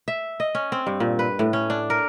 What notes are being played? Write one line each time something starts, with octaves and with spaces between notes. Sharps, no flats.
E5
D#5
C#4
C4
G2
A#2
B4
A2
C#4
D4
A#4